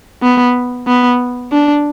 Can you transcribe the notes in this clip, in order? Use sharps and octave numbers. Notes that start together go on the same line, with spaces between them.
B3
B3
D4